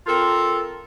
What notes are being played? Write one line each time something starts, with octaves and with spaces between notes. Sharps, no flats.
C4 F4 A4 A#4